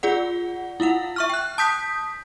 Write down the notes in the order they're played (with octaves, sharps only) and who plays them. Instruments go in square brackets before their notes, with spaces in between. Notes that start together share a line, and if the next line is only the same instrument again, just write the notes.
[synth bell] F4 G#4 D5 F#5
E4 F4 F5 F#5
E5 C#6 F6
G5 F#6
A5 D#6 G6 B6